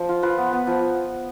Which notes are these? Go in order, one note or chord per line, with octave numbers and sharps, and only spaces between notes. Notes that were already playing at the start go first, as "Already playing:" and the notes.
Already playing: F3
F4
F4 B4
B3
B3
F3